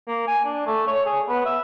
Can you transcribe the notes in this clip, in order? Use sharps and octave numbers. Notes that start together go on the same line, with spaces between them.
A#3
G#5
D4
A3
C#5
G#4
B3
E5